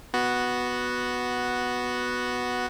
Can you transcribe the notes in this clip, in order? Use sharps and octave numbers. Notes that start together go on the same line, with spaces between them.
B3 F#4